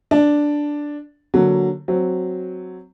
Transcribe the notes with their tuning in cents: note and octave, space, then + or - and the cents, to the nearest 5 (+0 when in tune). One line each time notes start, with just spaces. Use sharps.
D4 +0 D5 +0
D3 +0 F#3 +0 A#3 +0
F#3 +0 C4 +0